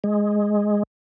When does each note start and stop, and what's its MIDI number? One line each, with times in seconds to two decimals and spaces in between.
0.04 0.83 56